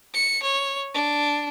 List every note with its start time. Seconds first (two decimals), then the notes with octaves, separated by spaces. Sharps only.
0.13 C#7
0.42 C#5
0.94 D4